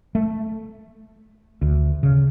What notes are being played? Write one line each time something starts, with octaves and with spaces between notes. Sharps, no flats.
A3
D2
C#3